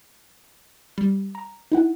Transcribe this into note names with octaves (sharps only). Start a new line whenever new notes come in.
G3
A#5
D#4 E4 F#5